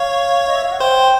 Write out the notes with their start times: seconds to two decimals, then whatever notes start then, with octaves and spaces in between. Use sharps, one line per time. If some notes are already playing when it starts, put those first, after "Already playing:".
Already playing: C#5 F5
0.48 D#5
0.56 E5
0.64 F5
0.72 F#5
0.80 C5 G5